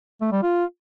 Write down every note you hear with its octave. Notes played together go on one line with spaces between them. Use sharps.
A3
G3
F4